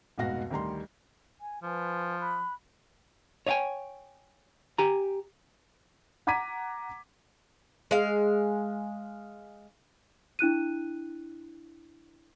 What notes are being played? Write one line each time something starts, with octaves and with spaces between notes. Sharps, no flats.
F1 G#2 B2 F#4 F5 A#6
D2 D#3 G3 A#5 C6
G#5
F3 B4 G#5
B5 F#6
C#5 D#5 F5 G5 G#5
G4 G#5 A#5
F#5 A#5 D6 G#6 B6 D#7
G#3 F5
D4 E4 F#6 D#7